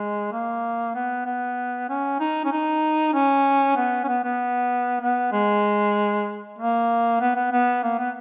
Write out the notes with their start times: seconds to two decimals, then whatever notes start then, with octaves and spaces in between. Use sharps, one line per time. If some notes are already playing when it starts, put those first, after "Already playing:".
Already playing: G#3
0.32 A#3
0.95 B3
1.26 B3
1.89 C#4
2.20 D#4
2.45 C#4
2.52 D#4
3.14 C#4
3.76 B3
4.04 C#4
4.08 B3
4.24 B3
5.01 B3
5.32 G#3
6.58 A#3
7.20 B3
7.35 B3
7.52 B3
7.83 A#3
7.99 B3